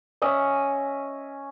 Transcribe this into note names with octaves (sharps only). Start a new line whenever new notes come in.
C#4 D#5 E5